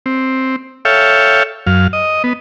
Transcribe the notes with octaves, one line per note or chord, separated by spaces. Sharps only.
C4
A4 C#5 E5 F5 G5
F#2 F5
D#5
B3